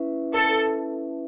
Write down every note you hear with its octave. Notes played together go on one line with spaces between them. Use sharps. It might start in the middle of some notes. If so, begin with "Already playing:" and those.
Already playing: C#4 E4 B4 E5
A4